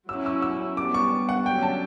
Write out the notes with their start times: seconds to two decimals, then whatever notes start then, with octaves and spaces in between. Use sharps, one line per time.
0.09 F#3 C#4 E4 E6
0.26 E6
0.42 E6
0.77 G3 B3 D4 D6
0.94 C#6
1.29 F#5
1.46 D3 F#3 A3 C#4 G5
1.63 A5